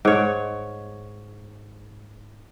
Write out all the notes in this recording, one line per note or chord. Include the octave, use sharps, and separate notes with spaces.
G#2 C#5